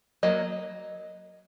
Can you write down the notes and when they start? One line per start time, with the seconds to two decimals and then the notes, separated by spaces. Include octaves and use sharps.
0.23 F#3 A#3 D#5